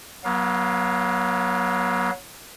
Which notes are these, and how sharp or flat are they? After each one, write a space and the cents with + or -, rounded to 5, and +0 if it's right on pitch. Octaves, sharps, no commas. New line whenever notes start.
F#3 +0 B3 -40 F5 +0